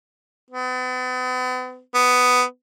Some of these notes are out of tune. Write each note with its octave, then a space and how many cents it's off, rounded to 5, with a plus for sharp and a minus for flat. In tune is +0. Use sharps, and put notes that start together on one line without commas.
B3 +40
B3 +10